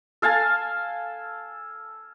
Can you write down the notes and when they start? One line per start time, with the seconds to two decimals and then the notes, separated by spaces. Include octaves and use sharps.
0.22 A4 F5 G#5 A5